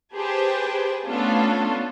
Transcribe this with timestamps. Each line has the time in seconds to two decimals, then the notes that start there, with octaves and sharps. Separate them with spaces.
0.15 G4 G#4 B4 C5 G5 A5
1.05 A3 B3 C#4 D4 F4 A4